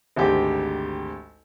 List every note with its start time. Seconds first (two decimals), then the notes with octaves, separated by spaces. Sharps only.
0.16 G#1 D2 G4